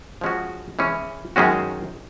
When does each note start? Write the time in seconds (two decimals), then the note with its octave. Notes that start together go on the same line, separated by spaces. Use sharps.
0.21 F3 G#3 C#4 F#4
0.79 E3 G#3 C#4
1.36 F#2 D#3 G#3 C#4 F#4